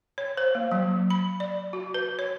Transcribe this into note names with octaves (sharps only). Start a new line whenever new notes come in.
C#5
C5
A#3
F#3
B5
D5
F#4
B4
C#5